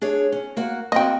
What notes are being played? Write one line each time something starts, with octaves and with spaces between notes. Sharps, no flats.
D4 G#4 C#5
C#4
A#3 F#4 F#5
A#3 C4 F#4 D#5 G5